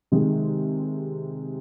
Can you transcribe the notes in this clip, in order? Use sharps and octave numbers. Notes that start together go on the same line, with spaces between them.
C3 D#3 G#3